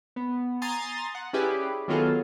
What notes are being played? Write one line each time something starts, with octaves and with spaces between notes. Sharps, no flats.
B3
G#5 A#5 C6 D#6 A6
F#5
C#4 E4 G4 G#4 B4 D5
D#3 F#3 B3 F4 G#4 A4